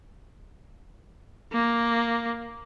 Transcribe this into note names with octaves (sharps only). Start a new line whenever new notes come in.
A#3